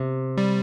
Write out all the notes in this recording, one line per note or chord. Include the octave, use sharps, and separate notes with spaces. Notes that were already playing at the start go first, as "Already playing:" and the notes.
Already playing: C3
G3